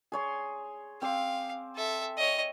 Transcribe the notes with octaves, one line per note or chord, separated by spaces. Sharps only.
G#4 C#5 C6
C4 F5 D6
A4 E5
C#5 D#5